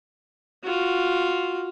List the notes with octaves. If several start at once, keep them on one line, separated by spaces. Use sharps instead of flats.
F4 F#4